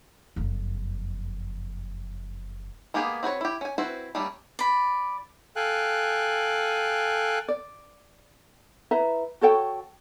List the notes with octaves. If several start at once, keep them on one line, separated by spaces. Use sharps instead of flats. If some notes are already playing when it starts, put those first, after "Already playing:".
F#1 F2
G#3 A#3 B3 G4 G#4
C4 F#4 B4 C#5
E4 G4
C#4 G#5
C4 E4 F#4 B4 C5
G3 A3 A#3 C#4 D4
D5 B5
A4 F5 G5 G#5 F#6
D5
E4 B4 E5 A#5
F#4 A4 C#5 G5